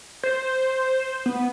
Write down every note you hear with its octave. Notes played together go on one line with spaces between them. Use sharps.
C5
B3